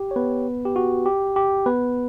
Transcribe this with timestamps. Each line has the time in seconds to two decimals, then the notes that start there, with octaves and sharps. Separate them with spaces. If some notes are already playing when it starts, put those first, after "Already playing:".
Already playing: G4
0.11 C#5
0.16 B3 B4
0.65 G4
0.76 F#4
1.06 G4
1.36 G4
1.66 B3 B4